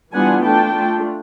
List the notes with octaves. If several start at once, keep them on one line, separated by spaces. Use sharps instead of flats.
E3 G3 B3 D4 F4 F#5 G#5
A3 D4 F4 G5 A5
A3 D4 F4